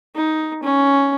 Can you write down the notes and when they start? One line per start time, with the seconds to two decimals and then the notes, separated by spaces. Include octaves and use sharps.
0.15 D#4
0.63 C#4